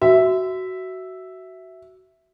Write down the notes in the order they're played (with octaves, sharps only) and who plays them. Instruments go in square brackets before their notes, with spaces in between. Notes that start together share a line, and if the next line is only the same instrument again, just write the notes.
[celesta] F#4 [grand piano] E5